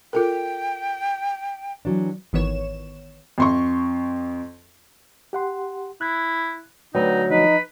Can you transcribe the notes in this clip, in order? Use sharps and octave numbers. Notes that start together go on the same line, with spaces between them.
F4 A4 A#4 G5
E3 F#3 D4
G#1 D#3 E3 B3 C#5 E7
F2 C6 C#6
G4 F#5 C6
E4 F#6 G#6
D2 F#3 D#4 B4 D5 G5
F3 D#4 B4